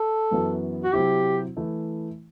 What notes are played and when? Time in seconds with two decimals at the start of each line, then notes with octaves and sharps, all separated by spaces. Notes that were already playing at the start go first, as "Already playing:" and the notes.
Already playing: A4
0.31 F#2 E3 B3 F#4 B4
0.84 F#4
0.93 C3 F#3 C4 E4 G4
1.57 E3 A3 E4